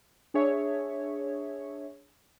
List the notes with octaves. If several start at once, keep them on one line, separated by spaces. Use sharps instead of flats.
D4 G#4 C#5 E5